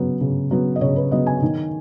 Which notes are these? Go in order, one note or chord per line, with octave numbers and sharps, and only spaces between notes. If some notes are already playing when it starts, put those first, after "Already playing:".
Already playing: C#3 F#3 B3
C#3
F#3 B3
D#5
C#3 C#5
B4
F#3 B3 D#5
G#5
D#3